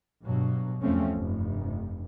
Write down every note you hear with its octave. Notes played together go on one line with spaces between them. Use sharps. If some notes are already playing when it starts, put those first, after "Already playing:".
G2 B2 F#3
E2 F3 G3 A3 C4 C#4
F1 G2